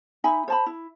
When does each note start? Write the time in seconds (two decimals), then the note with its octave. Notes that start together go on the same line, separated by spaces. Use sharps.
0.24 D#4 E5 G#5 B5
0.48 C5 A5 B5
0.66 E4